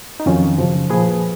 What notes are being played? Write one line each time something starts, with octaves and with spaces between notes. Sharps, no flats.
D#4
F2 D#3 F#3 C#4 F4
F#2 C#3 F3
A#2 F3 G#4 B4